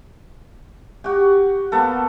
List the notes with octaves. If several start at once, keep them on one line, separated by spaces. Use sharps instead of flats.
F#4 G4
A#3 B3 A4